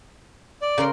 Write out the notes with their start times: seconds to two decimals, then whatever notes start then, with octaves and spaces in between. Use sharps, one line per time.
0.62 D5
0.78 C#3 A#4 C6